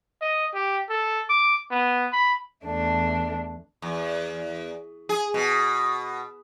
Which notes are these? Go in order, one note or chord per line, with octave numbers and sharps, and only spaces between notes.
D#5
G4
A4
D6
B3
B5
E2 A3 D4
E2
G#4
B2